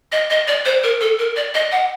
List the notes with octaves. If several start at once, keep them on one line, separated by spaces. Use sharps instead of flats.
D#5
D#5
D5
C5
A#4
A4
A#4
D5
D#5
F#5